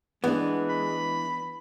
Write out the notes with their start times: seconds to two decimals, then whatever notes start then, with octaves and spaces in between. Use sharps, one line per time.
0.24 E3 G#3 B3 D4
0.69 B5